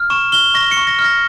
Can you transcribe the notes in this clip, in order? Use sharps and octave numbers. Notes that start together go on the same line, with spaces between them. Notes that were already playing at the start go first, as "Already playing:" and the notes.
Already playing: F6
C#6 E7
F6 G7
C#6 A#6
C#7
C#6
A#6
F6
A#6